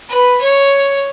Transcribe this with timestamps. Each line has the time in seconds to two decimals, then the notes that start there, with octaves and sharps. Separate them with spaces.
0.09 B4
0.41 C#5